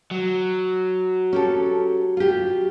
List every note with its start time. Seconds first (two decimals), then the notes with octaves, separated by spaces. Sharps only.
0.11 F#3
1.33 C#4 G4 A4
2.17 F4 G4